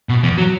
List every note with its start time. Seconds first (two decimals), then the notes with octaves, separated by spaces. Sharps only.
0.09 B2
0.23 E2
0.38 F#3